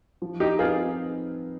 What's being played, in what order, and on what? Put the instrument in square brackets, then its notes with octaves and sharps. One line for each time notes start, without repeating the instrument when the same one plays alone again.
[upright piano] F3
[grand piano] D#4 G4
[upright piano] C4 D#4 B4 [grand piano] F4 G#4